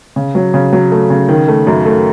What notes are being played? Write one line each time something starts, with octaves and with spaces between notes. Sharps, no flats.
C#3
F#3
C#3
F#3
A3
C#3
D#3
A3
F#2
A3